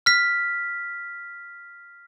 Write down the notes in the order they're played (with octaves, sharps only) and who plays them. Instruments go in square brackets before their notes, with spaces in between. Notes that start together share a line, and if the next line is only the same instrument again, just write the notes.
[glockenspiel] F6 B6